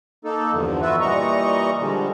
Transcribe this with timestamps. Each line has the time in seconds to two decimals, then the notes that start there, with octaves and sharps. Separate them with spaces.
0.25 A#3 D#4 A4
0.52 E2 G2 D3 F3
0.82 F4 F#4 B4 E5
1.01 A#2 E3 G3 D#5 A#5 C#6
1.80 D3 F3 G3 G#3